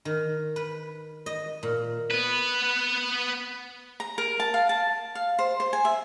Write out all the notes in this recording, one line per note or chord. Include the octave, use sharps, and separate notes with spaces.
D#3
B4
D#5
A#2
B3 B4
A#5
A#4
A5
F5
A5
F5
C5
C5
G#5
E5